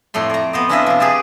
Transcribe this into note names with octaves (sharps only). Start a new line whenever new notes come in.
F2 A2 A3 C6
D5 A#5
B3 C5 D#5
C#4 D4 E4 F4 D#5 E5
C3 F3
G4 G#4 B4 D5 G#5 A5